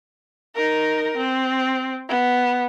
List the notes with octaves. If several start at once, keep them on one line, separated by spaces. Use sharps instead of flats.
D#4 A#4
C4
B3